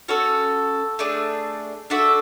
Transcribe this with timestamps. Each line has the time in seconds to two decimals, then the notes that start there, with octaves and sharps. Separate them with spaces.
0.08 C#4 F#4 A4 C#5
0.99 A3 D4 G#4
1.90 D4 F#4 A4 E5